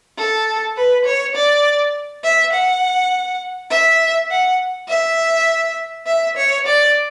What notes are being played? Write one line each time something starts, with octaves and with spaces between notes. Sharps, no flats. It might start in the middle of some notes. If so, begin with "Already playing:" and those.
A4
B4
C#5
D5
E5
F#5
E5
F#5
E5
E5
C#5
D5